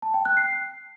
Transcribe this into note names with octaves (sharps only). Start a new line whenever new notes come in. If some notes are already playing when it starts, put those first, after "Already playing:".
A5
G5
F#6
C7